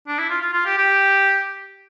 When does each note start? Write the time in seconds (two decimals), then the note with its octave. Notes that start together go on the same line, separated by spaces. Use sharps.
0.08 D4
0.19 E4
0.30 F4
0.41 F4
0.53 F4
0.66 G4
0.77 G4